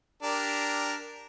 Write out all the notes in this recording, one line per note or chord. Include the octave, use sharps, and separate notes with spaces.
D4 G4 A#4